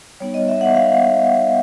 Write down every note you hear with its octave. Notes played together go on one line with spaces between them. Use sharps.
G3 B3 D#4 C#5
D#5
E5
F#5
F5